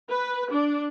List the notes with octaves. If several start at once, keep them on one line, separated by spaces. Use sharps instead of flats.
B4
D4